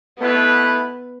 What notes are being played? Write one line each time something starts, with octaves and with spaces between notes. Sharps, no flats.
B2 A3 B3 E4 B4